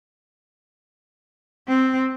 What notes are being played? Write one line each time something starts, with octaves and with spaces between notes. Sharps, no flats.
C4